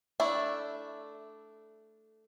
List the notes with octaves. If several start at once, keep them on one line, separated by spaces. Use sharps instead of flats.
A3 D4 E4